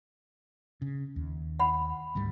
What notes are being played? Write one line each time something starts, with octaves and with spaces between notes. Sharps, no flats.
C#3
D#2
F#5 B5
D2 G#2 G3